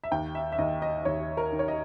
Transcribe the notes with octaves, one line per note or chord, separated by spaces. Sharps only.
E5
D#2 G5
E5
E5
D#2 D#5
D#5
D#2 C#5
A#4
D#3
C#5
D#5